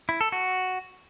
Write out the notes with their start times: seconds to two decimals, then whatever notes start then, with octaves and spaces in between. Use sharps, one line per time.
0.09 E4
0.21 A4
0.32 F#4